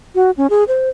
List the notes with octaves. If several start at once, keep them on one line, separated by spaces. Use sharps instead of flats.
F#4
C#4
G#4
C5